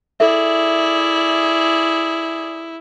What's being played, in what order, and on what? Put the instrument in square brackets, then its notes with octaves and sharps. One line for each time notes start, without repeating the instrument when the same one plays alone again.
[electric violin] E4 [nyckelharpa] G#4 D5 [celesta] A4 E5